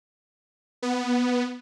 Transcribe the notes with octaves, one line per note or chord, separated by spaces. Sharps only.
B3